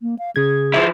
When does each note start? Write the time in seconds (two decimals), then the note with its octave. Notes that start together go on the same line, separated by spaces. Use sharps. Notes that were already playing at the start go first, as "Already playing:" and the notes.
0.01 A#3
0.19 F5
0.36 C#3 G#4 G#6
0.74 F3 E4